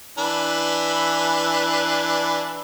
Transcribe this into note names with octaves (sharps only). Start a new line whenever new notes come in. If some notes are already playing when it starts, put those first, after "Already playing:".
E3 D4 B4